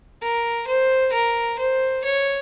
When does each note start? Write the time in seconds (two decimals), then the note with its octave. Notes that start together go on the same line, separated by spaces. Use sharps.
0.22 A#4
0.67 C5
1.13 A#4
1.59 C5
2.05 C#5